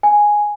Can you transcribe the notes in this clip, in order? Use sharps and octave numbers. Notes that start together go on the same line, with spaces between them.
G#5